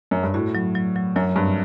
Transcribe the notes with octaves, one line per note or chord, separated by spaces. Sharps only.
F#2
G2
A2 F#4
F#3
F#3
F#3
F#2 F#3
G2 C4